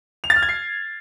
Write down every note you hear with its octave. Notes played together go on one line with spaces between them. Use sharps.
F7
A6
F6
G#6
C7